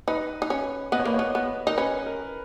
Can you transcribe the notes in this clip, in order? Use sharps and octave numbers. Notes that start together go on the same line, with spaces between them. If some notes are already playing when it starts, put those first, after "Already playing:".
D#4 B4
D#4
C#4
B3 D#5
C#5
A#3 B4
B3 C#5
B3
D#4 A#4
C#4 B4
A#4